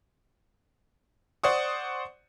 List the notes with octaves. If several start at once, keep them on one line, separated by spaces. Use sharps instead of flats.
C5 D5 F#5 C#6 D#6